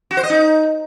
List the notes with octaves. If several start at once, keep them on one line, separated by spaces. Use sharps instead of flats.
F#4
C5
D#5
D#4